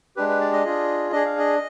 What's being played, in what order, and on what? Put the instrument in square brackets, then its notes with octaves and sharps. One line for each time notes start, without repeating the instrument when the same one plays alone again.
[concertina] G#3 D4 G4 B4
B4
D5
D#5
D4 F4 G#4
D4 G#4 D#5
F5
D#5